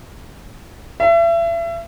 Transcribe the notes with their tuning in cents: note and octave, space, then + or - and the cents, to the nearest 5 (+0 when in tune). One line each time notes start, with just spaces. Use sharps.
E5 +35